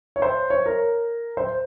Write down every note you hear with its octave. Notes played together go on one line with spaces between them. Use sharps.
C#5
C5
C#5
A#4
C5